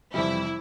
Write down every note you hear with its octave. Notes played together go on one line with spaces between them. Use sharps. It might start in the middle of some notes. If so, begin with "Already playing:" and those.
F2 C3 E3 G3 E4